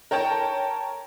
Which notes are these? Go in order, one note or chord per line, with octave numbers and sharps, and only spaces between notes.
A#4 C#5 G5 A5 A#5